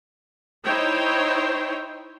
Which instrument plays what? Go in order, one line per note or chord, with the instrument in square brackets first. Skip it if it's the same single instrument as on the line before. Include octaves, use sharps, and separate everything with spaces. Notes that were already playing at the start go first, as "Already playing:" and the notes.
[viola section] D#4 E4 C5 C#5 G5